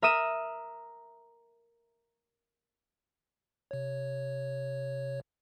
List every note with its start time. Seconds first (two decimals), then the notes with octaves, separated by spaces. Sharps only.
0.02 A#4 E5 A#5 D#6 D#7 E7
3.71 C3 C#5